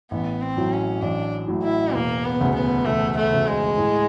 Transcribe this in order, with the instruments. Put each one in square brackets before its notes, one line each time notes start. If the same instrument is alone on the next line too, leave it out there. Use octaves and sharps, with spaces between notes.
[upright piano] A1 [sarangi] B3
[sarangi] C4
[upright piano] A2 F#3
[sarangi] C#4
[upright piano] A1 [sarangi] D4
[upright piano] A2 F#3
[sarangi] E4
[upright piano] E1 [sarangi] A#3
[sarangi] B3
[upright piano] D2 C#3
[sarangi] B3
[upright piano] E1 [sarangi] A3
[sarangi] A3
[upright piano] D2 C#3
[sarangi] G#3
[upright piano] A2